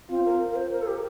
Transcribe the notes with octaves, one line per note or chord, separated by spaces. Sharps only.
C4 F4
A#4
A#4
C5
A#4
A4
G4